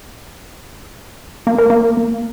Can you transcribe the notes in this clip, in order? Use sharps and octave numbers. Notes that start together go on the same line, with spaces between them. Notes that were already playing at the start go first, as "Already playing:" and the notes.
A#3
A#4
A#3